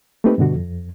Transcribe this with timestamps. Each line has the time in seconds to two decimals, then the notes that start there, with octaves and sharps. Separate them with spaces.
0.24 A3 A#3 C4 D#4 G4 B4
0.38 G2 B2 D3 F#4
0.56 F2